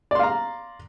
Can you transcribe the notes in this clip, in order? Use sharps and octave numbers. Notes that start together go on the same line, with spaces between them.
D5 F5 A#5 C6